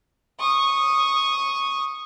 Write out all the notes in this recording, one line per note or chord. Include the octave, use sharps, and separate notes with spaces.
C#6 D#6